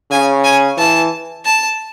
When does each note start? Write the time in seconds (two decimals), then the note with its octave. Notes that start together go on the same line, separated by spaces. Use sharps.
0.11 C#3 G#5
0.44 G#5
0.78 E3 A5
1.45 A5